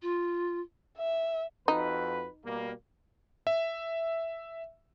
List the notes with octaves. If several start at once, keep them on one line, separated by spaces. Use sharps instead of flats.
F4
E5
F2 D#4 F#4 B4
B2 G3 A#3
E5